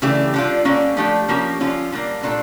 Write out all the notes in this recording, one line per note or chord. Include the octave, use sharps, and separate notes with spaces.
C#3 E3 A3 D4 G4
D3 G3 D4 F4
D3 G3 A#3 C#4
F3 A3 D4 G4
F3 A#3 C#4 G4
D3 F3 C#4 F4
D3 G3 A#3
A#2 A3 D4 F4 A4